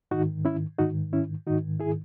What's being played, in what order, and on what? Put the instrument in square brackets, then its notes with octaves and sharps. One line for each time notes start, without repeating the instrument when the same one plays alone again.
[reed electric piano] G#2 D#3 D#4 F#4
C#4 E4
G#2 D#3 D#4 F#4
C#4 E4
G#2 D#3 D#4 F#4
E4 G#4